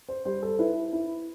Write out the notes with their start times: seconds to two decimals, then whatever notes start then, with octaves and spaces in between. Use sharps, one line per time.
0.09 C5
0.25 G3 C5
0.42 A4
0.59 E4 B4
0.93 E4